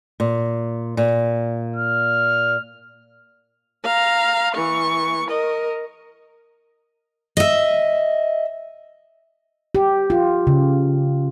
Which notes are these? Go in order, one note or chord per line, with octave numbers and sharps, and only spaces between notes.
A#2
A#2
F6
F5 A#5
E3 C#6
A#4 D#5
D#5 E5
G4
F4
C#3